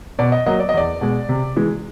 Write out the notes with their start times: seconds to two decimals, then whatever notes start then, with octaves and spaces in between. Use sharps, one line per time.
0.19 B2 D5
0.32 D#5
0.46 F#3 A#3 D#5
0.60 D5
0.69 D#5
0.74 E2 D5
1.01 B2 G#3
1.29 C3
1.56 E3 G#3